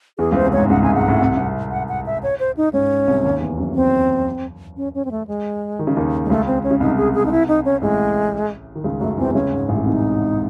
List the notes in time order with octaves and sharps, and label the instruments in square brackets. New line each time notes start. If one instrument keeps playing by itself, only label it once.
[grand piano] E2 E3 [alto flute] G#4
[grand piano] C#2 C#3 [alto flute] C5
[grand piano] C2 C3
[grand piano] G#2 [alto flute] C#5
[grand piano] C#2 C#3 [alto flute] F#5
[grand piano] C2 C3 [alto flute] G#5
[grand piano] G#2 [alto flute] F#5
[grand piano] A1 A2
C2 C3
C2 C3
[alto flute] F#5
F#5
E5
C#5
C5
D#4
[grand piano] G#2 [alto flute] C#4
[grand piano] C2 C3
D#2 D#3
E2 E3
F#2 F#3
[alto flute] C4
C#4
C#4
C4
A3
G#3
[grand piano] D#3
C#3
D#2 D#3
[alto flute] G#3
[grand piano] C#2 C#3 [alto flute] A3
[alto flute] C4
C#4
[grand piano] C#3
[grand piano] C2 C3 [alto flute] D#4
[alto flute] G#4
G#4
D#4
E4
D#4
C#4
[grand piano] A1 A2 [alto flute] G#3
[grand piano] D#3
C#2 C#3
[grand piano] F#2 F#3 [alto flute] A3
[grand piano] E2 E3 [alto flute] C4
[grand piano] C3
[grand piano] C#2 C#3 [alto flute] C#4
[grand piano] G#2
A1 A2
C#3
[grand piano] C2 C3 [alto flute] D#4